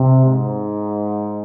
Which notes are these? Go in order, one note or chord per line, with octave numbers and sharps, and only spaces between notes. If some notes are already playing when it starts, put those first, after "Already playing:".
Already playing: C3
G#2